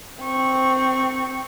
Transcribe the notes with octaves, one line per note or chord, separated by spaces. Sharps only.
C4 C#6